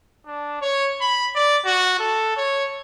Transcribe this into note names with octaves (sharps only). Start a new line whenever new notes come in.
D4
C#5
B5
D5
F#4
A4
C#5